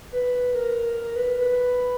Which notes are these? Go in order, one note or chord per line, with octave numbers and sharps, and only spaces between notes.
B4
A#4
A#4
B4
B4